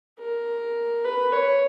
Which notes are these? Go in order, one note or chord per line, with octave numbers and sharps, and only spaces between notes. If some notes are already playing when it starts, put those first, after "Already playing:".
A#4
B4
C#5